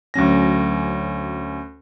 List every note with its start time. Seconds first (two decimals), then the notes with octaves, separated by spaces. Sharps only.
0.14 D2 F#3 C#4 A#6